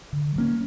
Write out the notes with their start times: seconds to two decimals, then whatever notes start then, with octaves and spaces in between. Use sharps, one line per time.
0.13 D3
0.36 F#3 A#3 C#4